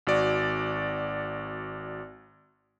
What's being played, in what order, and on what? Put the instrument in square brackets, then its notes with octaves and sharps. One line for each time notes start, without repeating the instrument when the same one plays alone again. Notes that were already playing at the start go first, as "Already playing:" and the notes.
[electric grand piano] G#1 F#4 D5